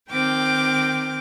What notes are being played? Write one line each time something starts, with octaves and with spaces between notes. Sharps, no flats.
D#3 C4 G5 D6 F6